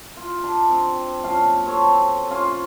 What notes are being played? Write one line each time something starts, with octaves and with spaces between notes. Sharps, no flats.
F4
D4 A#5
C4
F#2 A#2 F5 A5
C4 A4 C#5
C#4 F4 C5 G#5